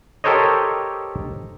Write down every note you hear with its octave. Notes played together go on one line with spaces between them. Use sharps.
G4 A4 A#4 C5 C#5 D#5